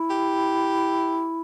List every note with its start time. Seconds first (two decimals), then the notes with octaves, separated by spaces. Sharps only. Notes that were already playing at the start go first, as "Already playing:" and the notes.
Already playing: E4
0.10 G4